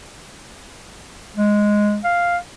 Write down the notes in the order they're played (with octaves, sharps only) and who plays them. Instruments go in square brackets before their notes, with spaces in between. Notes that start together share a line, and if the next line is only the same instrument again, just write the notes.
[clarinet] G#3
F5